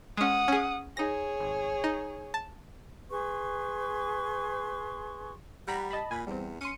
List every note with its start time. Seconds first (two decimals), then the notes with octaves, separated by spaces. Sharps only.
0.17 G#3 C#4 F#5 D#6
0.48 C#4 G#4
0.97 D#4 G#4 C#5 A#6
1.40 G#1
1.84 D#4
2.34 A5
3.10 G#4 B4 C6 C#6
5.68 G3 F#5 A#5 B5
5.91 D#5 A5 B5
6.11 A#2 G#5 B5
6.27 E2 G3 C4
6.61 C#4 C6 C#7 D#7